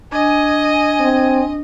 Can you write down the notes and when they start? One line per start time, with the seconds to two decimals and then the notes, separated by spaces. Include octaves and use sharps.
0.12 D4 D#5 G#5
1.00 C4